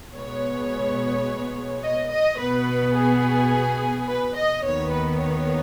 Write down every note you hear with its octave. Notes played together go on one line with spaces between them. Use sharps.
B2 G#3 B3 C#5
D#5
D#5
B2 B3 B4
G#4
B4
D#5
D#2 D#3 B3 C#5
B4
C#5